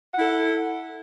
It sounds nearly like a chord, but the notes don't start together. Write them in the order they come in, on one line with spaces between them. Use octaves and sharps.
F#5 E4 A4